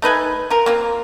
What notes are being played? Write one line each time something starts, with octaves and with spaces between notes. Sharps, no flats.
A3 D#4 B4 G#5
F4 A#4
A#3 C4 F4